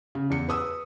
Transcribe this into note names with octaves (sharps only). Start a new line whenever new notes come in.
C#3
E2 C#7
B4 D#6 E6